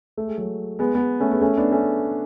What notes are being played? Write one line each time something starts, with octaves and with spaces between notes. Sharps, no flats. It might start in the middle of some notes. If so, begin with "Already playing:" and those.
A3
G#3
F#3 A3
G#3 B3
G#3 B3
A3 C#4
G#3 B3
A3 C#4
B3 D4
A3 C#4